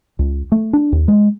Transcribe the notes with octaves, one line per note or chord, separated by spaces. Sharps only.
C#2
A3
D4
D#2
G#3